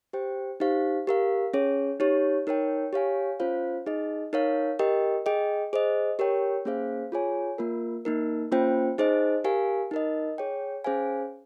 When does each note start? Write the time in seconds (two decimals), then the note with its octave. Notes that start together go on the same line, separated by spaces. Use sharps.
0.13 G4 C5 G5
0.60 D#4 G4 C5 F5
1.07 G4 A#4 F5
1.53 C#4 G#4 C#5
2.00 D#4 G4 C#5
2.47 D#4 A#4 C#5 G5
2.93 G4 C#5 F5 G#5
3.40 C#4 F4 C5 F5
3.86 D#4 G#4 D#5
4.33 D#4 A#4 C#5 F5
4.79 G4 A#4 D#5 G5
5.26 G#4 D#5 G5
5.73 G#4 C5 D#5
6.19 G4 A#4 C#5 G5
6.65 A#3 C#4 G#4 C5 F5
7.12 F4 G#4 C#5 G#5
7.58 A#3 F4 A#4
8.05 A#3 D#4 A#4
8.52 A#3 C#4 F4 C5 G5
8.98 D#4 G#4 C5 D#5
9.44 G4 A#4 F5 G#5
9.91 D#4 A#4 D#5
10.38 G#4 C#5 G5
10.84 C#4 G#4 C5 F5 G#5